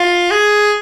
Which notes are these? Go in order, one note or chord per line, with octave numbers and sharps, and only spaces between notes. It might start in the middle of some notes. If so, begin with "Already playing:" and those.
Already playing: F4
G#4